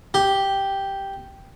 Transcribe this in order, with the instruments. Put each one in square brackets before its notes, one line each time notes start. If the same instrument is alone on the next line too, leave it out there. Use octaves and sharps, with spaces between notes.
[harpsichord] G4